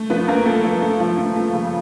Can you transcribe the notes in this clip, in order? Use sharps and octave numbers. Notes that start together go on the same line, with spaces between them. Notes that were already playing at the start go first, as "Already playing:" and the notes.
Already playing: A3
F3 B3 B4
A3 A#3 A#4
A3 A4
F3
A3
F3
A3
A3
C#3